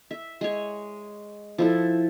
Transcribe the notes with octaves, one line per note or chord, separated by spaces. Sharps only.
E5
G#3 C#5
F3 E4 A4